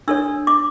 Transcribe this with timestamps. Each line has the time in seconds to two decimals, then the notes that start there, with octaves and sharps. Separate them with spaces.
0.08 D4 A4 C#5 E6
0.47 D6